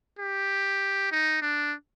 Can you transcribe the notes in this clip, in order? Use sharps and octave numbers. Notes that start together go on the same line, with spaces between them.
G4
D#4
D4